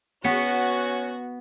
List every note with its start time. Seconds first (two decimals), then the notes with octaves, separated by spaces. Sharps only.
0.24 B3 C#4 F#4